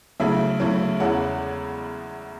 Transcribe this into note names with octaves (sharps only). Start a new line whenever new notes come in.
D2 C#3 F#3 C#4 E4 E5
D2 C#3 F#3 C#4 E4
E2 C#3 G#3 C#4 E4 F#5